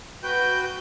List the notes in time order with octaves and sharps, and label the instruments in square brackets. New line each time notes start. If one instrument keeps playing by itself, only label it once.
[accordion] F#4 B4 G5 [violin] G6